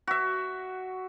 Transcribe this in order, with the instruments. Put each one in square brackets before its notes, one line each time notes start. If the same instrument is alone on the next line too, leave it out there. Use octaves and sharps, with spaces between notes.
[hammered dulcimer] F#4 E5